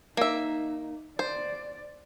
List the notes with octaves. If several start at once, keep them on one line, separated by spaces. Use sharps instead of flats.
A#3 D#4 E5
C5 D5